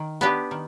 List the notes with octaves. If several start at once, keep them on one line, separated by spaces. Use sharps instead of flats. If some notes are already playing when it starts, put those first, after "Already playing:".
Already playing: D#3
B3 D4 G4 B4
D#3